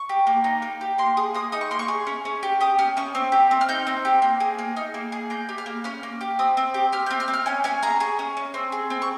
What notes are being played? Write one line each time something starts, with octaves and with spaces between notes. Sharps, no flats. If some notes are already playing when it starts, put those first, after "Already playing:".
Already playing: C#6
G4
A#3
D#4
A#3
G4
A#3 C6
G#4 D#6
A#3 D#6
D#4 D#6
C#6
A#3 C6
C#6
G#4
C#4
C#4
G4
G4 D#6
C#4 F6
C#4 C#6
C4
G4
C4
F6
D#4 G6
C4
G4
A#3
G#4
A#3
D#4 F6
A#3
G#4
A#3 G6
G4
F6
A#3
C#4 F6
A#3
G4
C4 D#6
C4
G4
G4 F6
C4 G6
F6
C4
F6
C#4 G#5
C#4 G#5
G#4 A#5
G#4 C#6
C#4
C#4
C4
G#4
C4
C#6